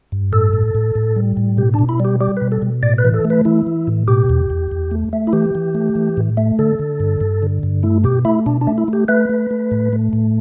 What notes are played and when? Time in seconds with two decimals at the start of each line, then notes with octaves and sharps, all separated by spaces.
0.12 G2
0.32 A2 A4
0.53 A2
0.75 A2
0.95 A2
1.16 G3
1.37 A2
1.57 B2 G4
1.74 D4
1.79 B2
1.89 E4
2.00 G3 G4
2.21 G3 G4
2.37 B2 B4
2.52 A4
2.62 B2
2.83 A2 D5
2.98 B4
3.05 E3
3.14 A4
3.25 A3
3.30 B4
3.45 E3 E4
3.67 E3
3.87 A2
4.08 B2 G4
4.30 E2
4.50 E2
4.71 E2
4.91 A3
5.13 A3
5.27 E4
5.33 E3 G4
5.55 E3
5.75 A3
5.95 E3
6.17 A2
6.37 A3
6.59 D3 A4
6.79 D3
7.00 G2
7.21 G2
7.43 D3
7.63 G2
7.83 A3 E4
8.04 B2 G4
8.25 A3 E4
8.46 B2 D4
8.61 D4
8.67 A3
8.78 E4
8.88 A3
8.93 G4
9.08 A3 B4
9.29 A3
9.51 A3
9.71 A2
9.93 A3
10.13 A2